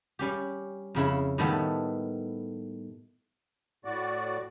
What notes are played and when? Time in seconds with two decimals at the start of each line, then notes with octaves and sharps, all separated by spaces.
0.19 G3 C#4 G4
0.95 F2 C#3 E4
1.38 A2 D#3 G3 A3 B3 A4
3.85 A2 F#4 D5